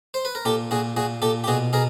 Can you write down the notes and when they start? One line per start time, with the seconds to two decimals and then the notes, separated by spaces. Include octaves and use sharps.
0.14 C5
0.25 B4
0.35 A#4
0.45 A#2 G4 A4
0.71 A#2 F#4 G#4
0.97 A#2 F#4 G#4
1.22 A#2 G4 A4
1.44 G4
1.47 B2 F#4 G#4
1.73 B2 G#4 A#4